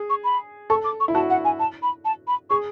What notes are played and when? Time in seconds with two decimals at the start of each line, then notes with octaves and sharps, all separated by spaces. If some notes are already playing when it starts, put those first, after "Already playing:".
Already playing: G#4
0.10 C#6
0.24 B5
0.70 A4 C#6
0.84 D6
1.00 C#6
1.08 E4
1.14 F#4 A5
1.30 F#5
1.45 G#5
1.59 A5
1.82 B5
2.05 A5
2.27 B5
2.50 G#4 C#6